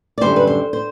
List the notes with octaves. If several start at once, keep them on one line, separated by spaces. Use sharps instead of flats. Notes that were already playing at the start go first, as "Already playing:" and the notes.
D5
F#2 D3 G3 C5
B4
C5
C5